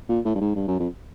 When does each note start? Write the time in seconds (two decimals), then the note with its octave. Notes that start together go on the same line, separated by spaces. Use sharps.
0.09 A#2
0.25 A2
0.35 G2
0.41 G#2
0.55 G2
0.68 F#2
0.79 F2